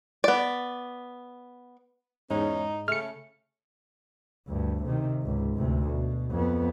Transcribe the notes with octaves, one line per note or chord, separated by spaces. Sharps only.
B3 D5
E2 G#2 C#4 D#4
C#3 A3 F6 C#7
D2 G2
C3 D#3
C#2 G#2
D2 C3
B2
F2 B3